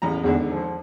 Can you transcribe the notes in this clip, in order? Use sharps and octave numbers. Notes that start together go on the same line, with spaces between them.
A1 E2 A#5
G#1 E2 D3
F3